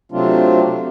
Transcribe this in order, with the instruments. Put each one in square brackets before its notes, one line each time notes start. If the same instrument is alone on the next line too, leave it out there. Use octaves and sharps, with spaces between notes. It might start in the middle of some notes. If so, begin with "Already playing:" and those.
[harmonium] C3 F#3 A3 C4 D4 F4